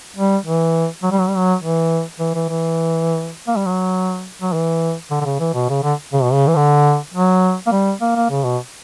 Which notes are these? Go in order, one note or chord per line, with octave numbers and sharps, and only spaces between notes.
G3
E3
F#3
G3
F#3
G3
F#3
E3
E3
E3
E3
A#3
G3
F#3
F#3
E3
D3
D3
C#3
E3
B2
C#3
D3
C#3
B2
C#3
E3
D3
F#3
A#3
G3
A#3
A#3
C#3
B2